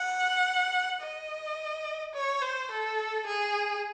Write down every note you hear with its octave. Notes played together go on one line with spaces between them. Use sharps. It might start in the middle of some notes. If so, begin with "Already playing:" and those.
Already playing: F#5
D#5
C#5
C5
A4
G#4